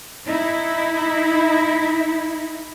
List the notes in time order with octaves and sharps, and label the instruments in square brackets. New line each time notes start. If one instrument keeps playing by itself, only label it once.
[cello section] D#4 E4